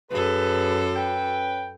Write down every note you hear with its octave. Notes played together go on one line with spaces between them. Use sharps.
F#2 G#4 A4 B4
C#4 B4 G5